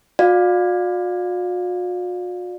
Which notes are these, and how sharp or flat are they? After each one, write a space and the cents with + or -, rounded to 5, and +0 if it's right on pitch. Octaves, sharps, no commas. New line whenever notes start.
F#4 -45 D5 +15 F5 +15